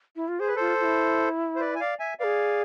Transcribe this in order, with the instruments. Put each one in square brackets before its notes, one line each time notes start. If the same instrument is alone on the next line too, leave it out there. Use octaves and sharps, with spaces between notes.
[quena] E4
F4
[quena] G#4 [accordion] C5
[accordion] B4
[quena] F4 [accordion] A4 C5
[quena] F4
E4
[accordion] C5
B4 D5
G#5
D5 F5
E5 G#5
[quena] G#4 B4 [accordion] D5 F5